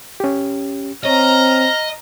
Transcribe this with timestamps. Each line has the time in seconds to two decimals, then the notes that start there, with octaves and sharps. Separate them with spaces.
0.20 C#4 G4
1.05 C4 C#5 D#5 A#5 F6